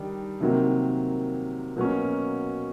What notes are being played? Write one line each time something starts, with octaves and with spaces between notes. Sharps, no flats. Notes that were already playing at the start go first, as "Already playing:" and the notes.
Already playing: D#3 G3 D4
C3 D#3 F#3 A#3
B2 F#3 A#3 C#4